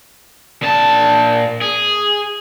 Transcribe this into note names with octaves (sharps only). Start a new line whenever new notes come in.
A#2 A5
G#4